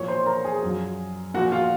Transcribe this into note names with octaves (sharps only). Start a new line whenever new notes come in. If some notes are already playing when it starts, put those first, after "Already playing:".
Already playing: A#2 F3 C#5 C#6
C5 C6
A#4 A#5
G#4 G#5
F#2 F3
A#2 F3 F#4 F#5
F4 F5